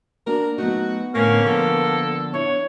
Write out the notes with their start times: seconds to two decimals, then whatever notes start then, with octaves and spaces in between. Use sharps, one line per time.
0.27 A#3 D4 F#4 A#4
0.58 F#3 A3 B3 D#4 F#4
1.15 A2 D3 A#3 C#4
1.45 D3 F3 A4
2.34 D4 E4 C#5